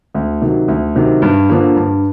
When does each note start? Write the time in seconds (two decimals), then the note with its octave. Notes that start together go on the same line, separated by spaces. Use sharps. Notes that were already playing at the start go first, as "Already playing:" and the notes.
0.15 D2
0.41 C3 D#3 F#3
0.68 D2
0.95 C3 D#3 F#3
1.22 G2
1.49 D3 F3 A#3
1.76 G2